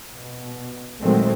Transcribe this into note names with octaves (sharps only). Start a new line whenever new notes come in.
B2
A#2 D#3 F#3 G#3 A3 C4